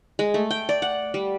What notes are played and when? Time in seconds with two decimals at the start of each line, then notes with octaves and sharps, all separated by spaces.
0.19 G#3
0.34 A3
0.51 G5
0.69 D5
0.82 F#5
1.14 G3